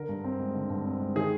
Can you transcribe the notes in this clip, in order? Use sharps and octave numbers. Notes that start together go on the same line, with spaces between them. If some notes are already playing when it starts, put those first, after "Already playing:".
Already playing: D3 A#4
G2
C4
G#3
D3
G2
C4
G#3
D#3 G#4